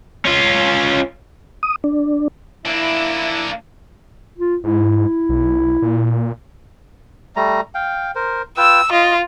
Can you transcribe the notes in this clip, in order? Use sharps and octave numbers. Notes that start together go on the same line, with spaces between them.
C#4 F4
D#6
D4
A#3 D4 E4
F4
G#2 E4
B1
A#2
G3 A3 A#5
F5 G5
A#4 C5
F4 B4 G5 E6
F4 D#5